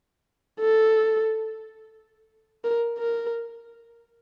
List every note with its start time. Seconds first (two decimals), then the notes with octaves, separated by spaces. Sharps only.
0.60 A4
2.64 A#4
2.98 A#4